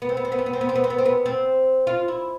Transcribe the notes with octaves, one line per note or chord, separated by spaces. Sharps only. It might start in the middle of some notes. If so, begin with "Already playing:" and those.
B3
C4
B3
C4
B3
C4
B3
C4
B3
C4
B3
C4
B3
C4
B3
C4
F4
E4